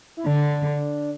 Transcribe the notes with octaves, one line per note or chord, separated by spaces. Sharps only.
E4
D3 D4